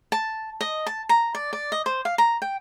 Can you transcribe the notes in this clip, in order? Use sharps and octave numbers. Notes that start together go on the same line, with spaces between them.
A5
D#5
A5
A#5
D5
D5
D#5
C5
F5
A#5
G5